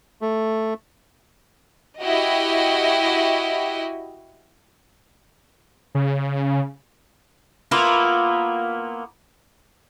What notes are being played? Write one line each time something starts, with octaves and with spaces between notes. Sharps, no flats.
A3
E4 F#4 G4 D#5
C#3
A#3 B3 E4 F4